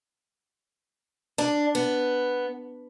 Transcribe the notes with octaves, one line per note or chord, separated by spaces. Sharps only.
D4
B3